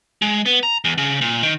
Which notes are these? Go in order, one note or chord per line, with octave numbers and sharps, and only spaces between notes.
G#3
B3
A#5
E2
C#3
A#2
D#3